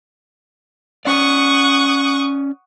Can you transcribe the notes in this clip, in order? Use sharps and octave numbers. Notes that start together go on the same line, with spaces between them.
C#4 D5 F#5 C#6 D#6